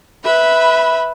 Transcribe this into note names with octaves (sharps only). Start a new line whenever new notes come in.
B4 E5 B5